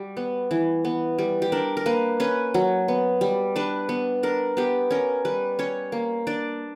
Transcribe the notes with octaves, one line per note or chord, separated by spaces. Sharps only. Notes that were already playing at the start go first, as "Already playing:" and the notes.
Already playing: G3 F#4
B3
E3
B3
G3
G4
D4 A#4
A#4
A#3 B4
C#4 B4
F#3
B3
G3
D4 B4
B3
D4 A#4
B3 G4
C#4 A#4
G3 B4
C#4 C#5
A#3
D4 D5